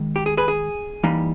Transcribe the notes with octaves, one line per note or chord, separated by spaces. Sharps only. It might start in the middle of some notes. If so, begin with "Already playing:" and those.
Already playing: D#3 G#3
G4
G#4
G#4 B4
G#4
E3 G3 A#3 D#4